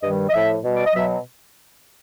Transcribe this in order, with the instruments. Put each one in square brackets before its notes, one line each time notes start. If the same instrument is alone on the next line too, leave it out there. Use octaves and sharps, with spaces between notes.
[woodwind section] G2 D#3 G3 D#5
D#5
A2 F3 E5
B2 G3
D5
D#5
B2 F#3 E5